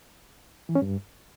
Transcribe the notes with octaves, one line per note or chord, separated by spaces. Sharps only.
E3
C#4
G2